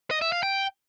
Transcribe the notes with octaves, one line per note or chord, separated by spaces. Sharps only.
D#5
E5
F5
G5